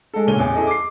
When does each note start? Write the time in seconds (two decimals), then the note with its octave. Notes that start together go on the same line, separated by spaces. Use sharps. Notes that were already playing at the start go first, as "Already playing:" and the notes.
0.14 G#3 A4
0.27 A#2 C#3 C#5 D#7 G7
0.39 A1 E2
0.55 E4 G#4 A4 D#5
0.67 D6 C7